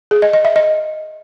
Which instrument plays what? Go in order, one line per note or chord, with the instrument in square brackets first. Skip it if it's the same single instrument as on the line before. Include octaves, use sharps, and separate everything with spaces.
[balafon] G#4
D#5
D#5
E5
D#5